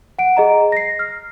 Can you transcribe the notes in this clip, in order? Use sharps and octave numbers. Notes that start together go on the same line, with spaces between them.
F#5 D7
G#4 D#5 A#5
A#6 C7
F6